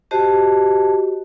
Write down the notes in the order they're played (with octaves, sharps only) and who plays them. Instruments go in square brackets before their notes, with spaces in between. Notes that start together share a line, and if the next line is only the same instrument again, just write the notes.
[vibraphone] F#4 G4 C5 D#5 A5